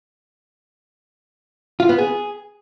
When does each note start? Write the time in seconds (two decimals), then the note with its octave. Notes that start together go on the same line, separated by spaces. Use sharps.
1.80 F4
1.89 B3
1.98 G#4